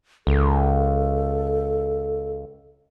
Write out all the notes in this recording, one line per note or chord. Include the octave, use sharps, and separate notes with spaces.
C#2 A4